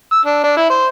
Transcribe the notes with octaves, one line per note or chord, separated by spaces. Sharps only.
E6
D4
D4
E4
C5